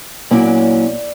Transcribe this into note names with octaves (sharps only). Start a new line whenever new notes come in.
A#2 F#3 A#3 C#4 E4 D5